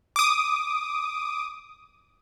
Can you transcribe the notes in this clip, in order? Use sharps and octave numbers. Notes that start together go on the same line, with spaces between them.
D6 D#6